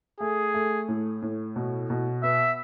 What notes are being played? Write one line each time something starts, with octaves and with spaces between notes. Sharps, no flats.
A3 G#4
A3
A2
A2
B2
B2
B3 E5